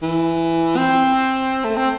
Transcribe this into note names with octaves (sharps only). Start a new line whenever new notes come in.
E3
C4
A3
C4